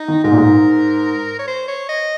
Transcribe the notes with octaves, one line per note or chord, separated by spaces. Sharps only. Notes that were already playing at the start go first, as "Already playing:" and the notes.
Already playing: D#4
D#3
G#2 A#4
A#2
G#2
C#5
C5
C#5
D#5